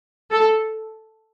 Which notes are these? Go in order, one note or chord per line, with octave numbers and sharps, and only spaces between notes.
A4